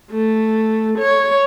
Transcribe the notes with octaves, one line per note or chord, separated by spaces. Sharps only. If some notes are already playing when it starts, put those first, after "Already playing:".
A3
C#5